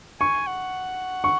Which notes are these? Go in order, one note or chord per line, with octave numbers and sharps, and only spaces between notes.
G#5 C#6
F#5
C#6